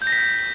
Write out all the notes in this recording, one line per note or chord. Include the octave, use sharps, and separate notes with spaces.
G6
A#6
B6
G6